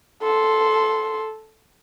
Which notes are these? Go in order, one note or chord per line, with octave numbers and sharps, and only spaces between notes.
A4 C6